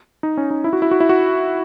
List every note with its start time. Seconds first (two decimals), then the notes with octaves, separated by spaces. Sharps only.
0.23 D#4
0.37 C#4
0.51 D#4
0.64 E4
0.73 F#4
0.82 E4
0.91 F#4
1.00 E4
1.09 F#4